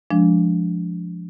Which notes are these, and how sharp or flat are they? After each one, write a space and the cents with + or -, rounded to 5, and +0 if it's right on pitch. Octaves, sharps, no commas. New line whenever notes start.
F3 +0 G#3 +0 D4 -15